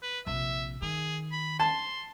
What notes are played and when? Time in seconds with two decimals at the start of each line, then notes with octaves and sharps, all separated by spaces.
0.02 B4
0.27 A#1 C3 E5
0.82 D#3 G#4
1.32 B5
1.60 A5 C6